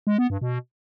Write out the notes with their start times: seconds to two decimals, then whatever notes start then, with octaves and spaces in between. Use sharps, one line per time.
0.07 G#3
0.18 B3
0.30 G2
0.41 B2